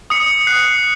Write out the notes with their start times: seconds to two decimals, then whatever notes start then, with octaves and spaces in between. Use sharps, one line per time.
0.10 D#6 C#7
0.47 F#6 C7